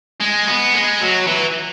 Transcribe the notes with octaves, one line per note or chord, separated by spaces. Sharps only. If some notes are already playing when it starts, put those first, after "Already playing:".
G#3
B3
G#3
F#3
E3